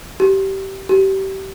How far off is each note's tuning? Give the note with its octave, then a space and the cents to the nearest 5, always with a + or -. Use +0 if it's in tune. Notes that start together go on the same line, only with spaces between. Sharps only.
G4 -25
G4 -30